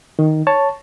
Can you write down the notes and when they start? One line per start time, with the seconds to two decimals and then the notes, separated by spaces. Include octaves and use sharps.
0.19 D#3
0.47 C#5 A5